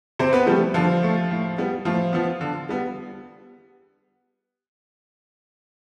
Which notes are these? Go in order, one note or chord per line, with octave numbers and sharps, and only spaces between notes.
C3 C4 C5
B3 B4
F3 G3 A3 G4
D3 F3 F4
A3
A2
G3 B3
A2 F3 F4
F3 B3
D3
G3 B3